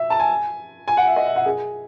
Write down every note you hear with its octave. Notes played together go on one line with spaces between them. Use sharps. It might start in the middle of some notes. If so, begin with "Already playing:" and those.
Already playing: E5
A5
G#5
G#5
F#5
E5
D#5
E5
F#5
G#4